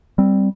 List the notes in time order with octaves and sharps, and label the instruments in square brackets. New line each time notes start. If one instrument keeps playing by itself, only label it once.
[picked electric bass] G3 C4